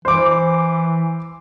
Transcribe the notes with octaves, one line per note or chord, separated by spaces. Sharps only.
E3 C5 D6